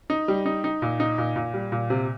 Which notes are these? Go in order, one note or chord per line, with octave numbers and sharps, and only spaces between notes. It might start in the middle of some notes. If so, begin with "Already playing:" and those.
D#4
G3
D#4
D#4
A#2
D#4
A#2
A#2
G3
A#2
C3